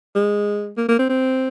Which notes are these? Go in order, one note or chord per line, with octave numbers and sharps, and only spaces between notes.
G#3
A#3
A#3
C4
C4